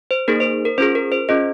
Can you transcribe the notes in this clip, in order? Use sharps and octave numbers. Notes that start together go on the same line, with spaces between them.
C5
A#3 D#4 G#4 A#4
C5
A#4
C#4 F4 G#4 C5
A#4
C5
C#4 F4 G#4 D#5